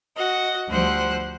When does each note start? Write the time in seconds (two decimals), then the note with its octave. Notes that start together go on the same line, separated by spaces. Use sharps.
0.15 F#4 D#5 F#5
0.68 D2 F3 G3 C5 F#5 F#6